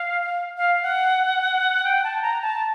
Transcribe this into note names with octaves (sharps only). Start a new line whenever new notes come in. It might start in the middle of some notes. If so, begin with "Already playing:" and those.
Already playing: F5
F5
F#5
G5
A5
A#5
A5